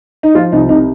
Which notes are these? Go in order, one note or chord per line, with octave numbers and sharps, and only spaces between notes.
D#4
F3 F4
C2 D#4
C3 D#4